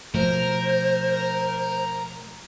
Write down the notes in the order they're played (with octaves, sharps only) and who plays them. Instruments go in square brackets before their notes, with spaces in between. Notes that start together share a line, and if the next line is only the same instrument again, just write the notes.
[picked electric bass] B2 F3 A3 [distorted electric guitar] A#4 [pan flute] C5